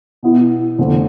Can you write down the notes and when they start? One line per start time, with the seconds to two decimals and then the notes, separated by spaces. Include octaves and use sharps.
0.23 B2 B3 E4
0.78 F1 F2 D3 F3 A3